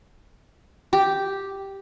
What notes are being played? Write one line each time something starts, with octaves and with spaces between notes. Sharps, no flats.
G4